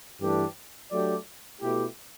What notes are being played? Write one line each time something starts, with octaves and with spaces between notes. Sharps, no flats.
G2 E3 A3 D4 G4
F#3 A3 D4 G4 D5
B2 A3 E4 G4